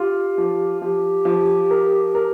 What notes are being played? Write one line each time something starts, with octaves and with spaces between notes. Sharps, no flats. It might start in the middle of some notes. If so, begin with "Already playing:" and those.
Already playing: F4 G4
F3
F3 G4
F3
A#4
A#4